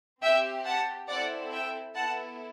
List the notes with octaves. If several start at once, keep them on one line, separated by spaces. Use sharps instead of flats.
C4 G4 E5 G5
F#5 A5
C4 E4 A4 D5 F#5
E5 G5
B3 E4 A4 F#5 A5